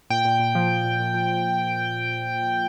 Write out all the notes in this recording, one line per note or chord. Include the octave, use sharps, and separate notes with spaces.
A#2 G5
A#2
A#2
F3
F3
A#2
A#2
F3